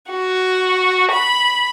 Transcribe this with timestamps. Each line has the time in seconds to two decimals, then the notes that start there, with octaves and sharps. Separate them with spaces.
0.10 F#4
1.12 B5